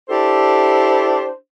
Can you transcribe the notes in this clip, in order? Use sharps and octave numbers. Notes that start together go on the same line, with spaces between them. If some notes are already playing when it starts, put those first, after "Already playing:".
D4 E4 G4 A4 C5